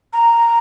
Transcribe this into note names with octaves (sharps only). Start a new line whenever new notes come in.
A#5